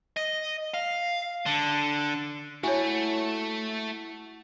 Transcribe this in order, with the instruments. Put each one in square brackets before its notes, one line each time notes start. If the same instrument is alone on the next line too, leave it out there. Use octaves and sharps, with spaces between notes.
[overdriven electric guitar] D#5
F5
D3
[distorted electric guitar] A3 [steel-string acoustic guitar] E4 [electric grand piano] F#4 [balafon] C#5 G#5